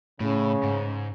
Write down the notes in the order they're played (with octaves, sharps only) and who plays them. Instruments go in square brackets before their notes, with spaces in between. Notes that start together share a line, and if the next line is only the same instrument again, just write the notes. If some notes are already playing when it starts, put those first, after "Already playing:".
[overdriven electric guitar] A2 [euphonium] C#3
[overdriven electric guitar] G#2